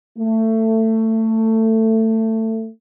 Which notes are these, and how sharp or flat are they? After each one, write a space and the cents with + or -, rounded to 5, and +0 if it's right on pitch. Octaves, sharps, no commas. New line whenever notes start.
A3 +20